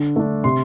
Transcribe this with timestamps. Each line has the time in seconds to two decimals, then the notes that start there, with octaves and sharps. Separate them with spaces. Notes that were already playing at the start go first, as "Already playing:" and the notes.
Already playing: D3
0.16 A3 D4
0.44 C3 C6